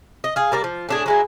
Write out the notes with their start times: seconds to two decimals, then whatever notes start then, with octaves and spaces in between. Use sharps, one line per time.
0.24 D#5
0.36 G#4 F5
0.52 G3 A#3 D5
0.64 F3
0.89 A2 D4 G#4
1.06 F#3 G#3 E4